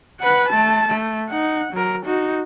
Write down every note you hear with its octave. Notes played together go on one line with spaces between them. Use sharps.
B4 F#5
A3 A5
A3
D#4 F#5
F#3 A#4
D#4 F#4